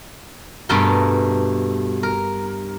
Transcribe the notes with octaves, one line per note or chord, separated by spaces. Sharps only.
G2 B2 A3 A#4 G5
A#4